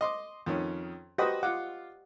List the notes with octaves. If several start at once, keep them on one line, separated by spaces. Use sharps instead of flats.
D#5 C6 D6
F2 D#3 C#4
F#4 G4 B4 C5 D#5 F#5
F4 F#5 D6